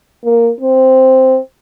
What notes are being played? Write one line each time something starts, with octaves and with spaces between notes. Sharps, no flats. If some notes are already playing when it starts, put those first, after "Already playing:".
A#3
C4